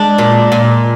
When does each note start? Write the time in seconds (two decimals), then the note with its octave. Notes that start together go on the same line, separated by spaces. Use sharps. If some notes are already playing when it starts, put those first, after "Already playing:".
Already playing: G#3 D4
0.18 A#2
0.52 A#2